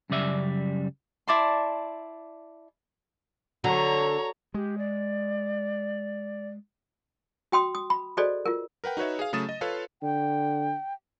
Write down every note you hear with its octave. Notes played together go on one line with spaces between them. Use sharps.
F#2 C#3 G3 D5 E5
E4 D5 A5 C6
D3 F#3 C#5 A#5
G#3 G4
D5
F#4 G5 C6 D#6
D#6
B5
F#4 G#4 A4 C5 D5 D#5
F4 A#4
A#4 B4 F#5 G5
D#4 F#4 B4 C#5 E5
G#4 F5
C#3 F#3 A3 D#6 A6 E7
D#5
F4 A4 B4 C#5 F5
D3 G5